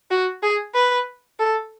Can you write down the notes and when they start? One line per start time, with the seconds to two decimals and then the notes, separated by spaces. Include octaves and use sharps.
0.11 F#4
0.43 G#4
0.74 B4
1.39 A4